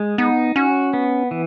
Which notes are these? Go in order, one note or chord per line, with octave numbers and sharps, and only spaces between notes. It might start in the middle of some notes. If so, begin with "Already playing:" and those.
Already playing: G#3
B3 D#4
C#4 F#4
B3
E3